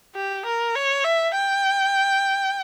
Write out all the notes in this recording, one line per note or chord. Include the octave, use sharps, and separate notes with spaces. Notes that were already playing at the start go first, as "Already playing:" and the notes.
G4
A#4
C#5
E5
G5